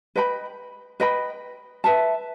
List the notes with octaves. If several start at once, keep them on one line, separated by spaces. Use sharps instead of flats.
B4 D#5 G5 B5
B4 D#5 G5 B5
B4 E5 A5